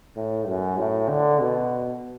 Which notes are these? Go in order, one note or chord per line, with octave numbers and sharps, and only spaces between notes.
A2
F#2
A2
D3
B2